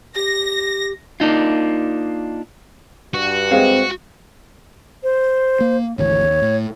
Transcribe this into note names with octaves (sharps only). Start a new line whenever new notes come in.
G4 A#6
A#3 D4 D#4 F4
G2 F#4
G#3 C4 F5
C5
A#3
G#1 D2 E3 C#5
D#2
A2